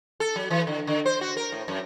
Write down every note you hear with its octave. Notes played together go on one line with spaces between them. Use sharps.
A4
F#3
E3
D3
D3
C5
F#4
A#4
A2
F#2